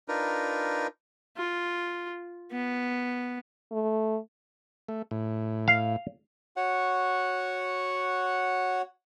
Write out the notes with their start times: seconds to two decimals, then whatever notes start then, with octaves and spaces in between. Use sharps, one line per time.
0.08 D4 D#4 F4 A#4 B4
1.37 F4
2.52 B3
3.72 A3
4.89 A3
5.11 A2
5.68 F5
6.57 F#4 C#5 F#5